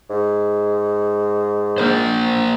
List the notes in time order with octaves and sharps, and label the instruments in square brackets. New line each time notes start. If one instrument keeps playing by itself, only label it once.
[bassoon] G#2
[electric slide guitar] A#3 A#4 C5